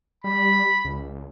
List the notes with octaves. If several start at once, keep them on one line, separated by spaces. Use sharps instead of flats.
G3 B5
C#2